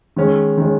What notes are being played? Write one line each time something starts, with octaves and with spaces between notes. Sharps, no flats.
D#3 G#3 C#4
D#3 G#3 C#4